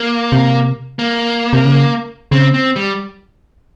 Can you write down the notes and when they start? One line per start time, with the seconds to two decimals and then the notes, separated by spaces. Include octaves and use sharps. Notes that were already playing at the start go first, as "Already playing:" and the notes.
Already playing: A#3
0.32 C3
0.99 A#3
1.53 C3
1.65 C#3
2.31 C#3 C4
2.54 C4
2.76 G3